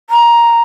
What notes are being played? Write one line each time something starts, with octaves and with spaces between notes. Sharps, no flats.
A#5